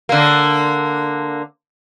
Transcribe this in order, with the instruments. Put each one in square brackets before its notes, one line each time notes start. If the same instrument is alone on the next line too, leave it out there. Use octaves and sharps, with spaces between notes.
[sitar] D3 A#3